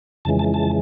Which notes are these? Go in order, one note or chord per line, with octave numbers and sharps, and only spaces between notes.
F2 C#3 E3 G#3 A5
A5
A5